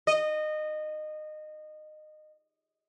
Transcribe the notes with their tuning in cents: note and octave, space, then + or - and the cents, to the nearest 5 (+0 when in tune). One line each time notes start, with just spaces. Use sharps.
D#5 -20